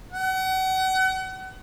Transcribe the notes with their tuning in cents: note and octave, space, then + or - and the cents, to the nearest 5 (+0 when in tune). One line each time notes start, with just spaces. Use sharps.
F#5 +35